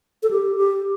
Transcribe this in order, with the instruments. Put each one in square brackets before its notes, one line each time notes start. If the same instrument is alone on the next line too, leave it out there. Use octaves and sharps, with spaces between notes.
[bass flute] A4
G4
G4